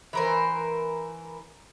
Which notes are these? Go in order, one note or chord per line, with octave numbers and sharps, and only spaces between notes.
E3 A#4 C5